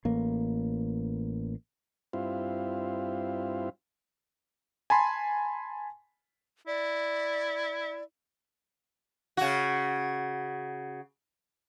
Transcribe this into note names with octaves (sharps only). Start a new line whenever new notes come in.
A1 A#3
G2 C4 E4 F4
G#5 A5 B5 C6
E4 D5
C#3 F#4